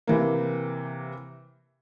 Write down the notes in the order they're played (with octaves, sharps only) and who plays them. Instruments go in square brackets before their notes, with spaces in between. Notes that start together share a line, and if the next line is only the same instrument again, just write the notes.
[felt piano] C3 E3 A#3